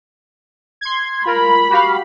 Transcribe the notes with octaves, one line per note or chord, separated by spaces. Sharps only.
C6 G#6
F4 A#4 B5
F#4 G4 F5